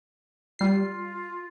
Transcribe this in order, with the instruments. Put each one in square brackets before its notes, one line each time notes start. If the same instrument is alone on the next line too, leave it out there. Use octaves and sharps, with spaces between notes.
[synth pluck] G3 C7 [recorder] F4